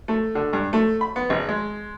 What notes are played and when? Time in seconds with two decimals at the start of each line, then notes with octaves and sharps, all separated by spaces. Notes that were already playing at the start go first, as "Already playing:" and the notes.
0.08 A3
0.35 D3
0.53 G2
0.73 A3
1.01 B5
1.16 B3
1.30 G#1
1.49 G#3